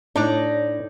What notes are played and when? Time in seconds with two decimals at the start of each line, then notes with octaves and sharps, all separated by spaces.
0.16 A2 D4 D#4 C#5 D5 A#5